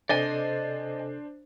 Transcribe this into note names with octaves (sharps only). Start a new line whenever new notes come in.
C3 D4 A4 C5 D5 D#5 G#5